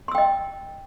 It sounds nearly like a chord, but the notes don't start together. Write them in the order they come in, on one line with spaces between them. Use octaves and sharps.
C6 E6 G5 D#5